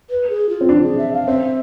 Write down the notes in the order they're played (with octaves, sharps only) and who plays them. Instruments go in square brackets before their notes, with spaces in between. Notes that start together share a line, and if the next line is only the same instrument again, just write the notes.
[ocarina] B4
G#4
F4
[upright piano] C4
[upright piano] D4 [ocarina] F4
[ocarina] G#4
E5
F5
[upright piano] C4 [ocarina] E5